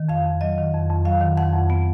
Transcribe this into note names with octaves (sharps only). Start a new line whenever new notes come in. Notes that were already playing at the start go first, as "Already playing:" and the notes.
Already playing: D#3
F2 F5
F2
F#3 D#5
D#3
F2
F2
F#3 F5
D#3
F2 F#5
F2
B3